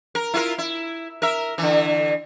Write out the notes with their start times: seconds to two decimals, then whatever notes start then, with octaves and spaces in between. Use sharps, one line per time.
0.15 A#4
0.34 E4 F4 A#4
0.58 E4
1.22 A#4 E5
1.58 D3 E3